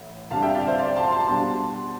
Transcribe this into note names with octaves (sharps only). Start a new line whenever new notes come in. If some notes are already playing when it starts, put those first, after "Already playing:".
Already playing: A1 A2
D2 C3 G3 D4 F5 A5
E5 G5
D5 F5
C5 E5
D5 F5
A5 C6
A5 C6
B2 G3 D4 A5 C6